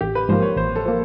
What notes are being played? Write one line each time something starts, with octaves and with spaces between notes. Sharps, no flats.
A1 G4
B4
G#2 F3 A#3 C5
C#5
A1 C5
A4
F3 A#3